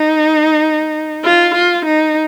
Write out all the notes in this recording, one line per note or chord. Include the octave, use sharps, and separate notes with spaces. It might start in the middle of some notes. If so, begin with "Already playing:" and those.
Already playing: D#4
F4
F4
D#4